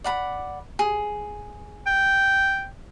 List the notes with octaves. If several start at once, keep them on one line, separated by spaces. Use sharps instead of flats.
D5 F#5 B5
G#4
G5